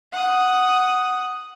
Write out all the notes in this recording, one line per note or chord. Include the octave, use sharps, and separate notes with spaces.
F#5 D#6